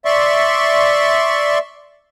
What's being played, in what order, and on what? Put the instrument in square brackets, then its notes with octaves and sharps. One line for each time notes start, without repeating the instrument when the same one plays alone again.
[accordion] D5 E5 C6 C#6